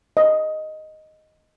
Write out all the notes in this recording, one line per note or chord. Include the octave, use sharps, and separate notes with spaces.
D#5